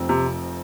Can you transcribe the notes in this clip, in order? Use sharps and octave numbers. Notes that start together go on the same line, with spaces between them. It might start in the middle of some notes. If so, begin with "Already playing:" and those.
Already playing: F1 F2 F3 C4
C3